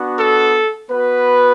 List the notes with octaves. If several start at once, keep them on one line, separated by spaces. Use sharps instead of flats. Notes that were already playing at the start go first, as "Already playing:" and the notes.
Already playing: B3 D4 F#4
A4
B3 F#4 B4